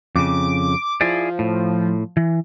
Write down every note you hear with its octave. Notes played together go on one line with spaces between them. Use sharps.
F2 C#3 D6
F3 E4 G#4 D5
A2
E3